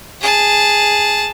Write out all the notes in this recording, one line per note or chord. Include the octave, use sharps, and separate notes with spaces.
G#4 A5